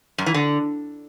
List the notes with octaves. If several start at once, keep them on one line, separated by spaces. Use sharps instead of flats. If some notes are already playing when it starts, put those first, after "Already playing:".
F#2
E3
D3